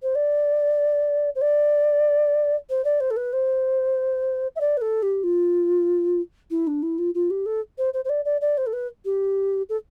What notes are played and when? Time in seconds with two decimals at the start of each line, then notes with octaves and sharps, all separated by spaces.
0.03 C5
0.15 D5
1.35 C5
1.41 D5
2.70 C5
2.84 D5
3.00 C5
3.11 A4
3.17 B4
3.33 C5
4.56 E5
4.60 D5
4.77 B4
4.81 A4
5.03 G4
5.24 F4
6.51 E4
6.67 D4
6.83 E4
6.98 F4
7.14 F4
7.30 G4
7.46 A4
7.78 C5
7.94 C5
8.05 C5
8.09 D5
8.25 D5
8.41 D5
8.57 C5
8.66 A4
8.73 B4
9.05 G4
9.69 A4